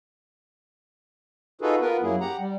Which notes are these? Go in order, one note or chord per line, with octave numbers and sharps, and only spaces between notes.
D#4 F4 F#4 G#4 A4 B4
B3 F4 A#4 B4
F#2 F#3 A#3 E4 G#4
G4 F#5 A#5
G3